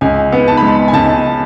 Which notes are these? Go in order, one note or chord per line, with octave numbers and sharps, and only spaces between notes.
C#2 G#5
B3
A5
B5
G#3 A5
G#5
C#2 A5